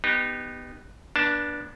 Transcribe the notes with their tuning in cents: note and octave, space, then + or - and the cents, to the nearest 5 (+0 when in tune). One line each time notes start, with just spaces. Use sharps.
B3 +0 D#4 -25 G4 +0
B3 -35 D4 +0 A5 +0